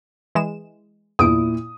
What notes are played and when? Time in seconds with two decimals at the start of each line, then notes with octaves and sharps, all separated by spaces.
0.35 E3 G#3 E7
1.19 E2 A#2 E4 D#6 D7